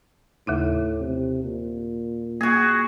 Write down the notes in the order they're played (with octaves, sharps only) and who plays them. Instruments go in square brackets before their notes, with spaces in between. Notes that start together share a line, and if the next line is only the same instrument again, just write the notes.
[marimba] D#2 C#3 D#4 [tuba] A2
[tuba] C3
A#2
[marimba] A#3 [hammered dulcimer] F#4 G#4